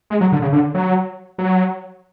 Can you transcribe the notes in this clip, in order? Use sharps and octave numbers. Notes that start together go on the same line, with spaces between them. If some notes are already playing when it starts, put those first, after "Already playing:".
G#3
F#3
D3
C#3
D3
F#3
F#3